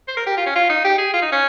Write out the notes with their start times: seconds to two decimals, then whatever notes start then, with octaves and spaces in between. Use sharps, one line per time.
0.08 C5
0.17 A#4
0.27 G4
0.37 F4
0.46 C#4
0.56 F4
0.69 D#4
0.85 G4
0.98 G#4
1.13 F4
1.22 D#4
1.32 C#4